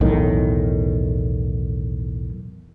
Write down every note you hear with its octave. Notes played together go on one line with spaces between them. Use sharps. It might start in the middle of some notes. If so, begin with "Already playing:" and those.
B1 E2 A2 D#3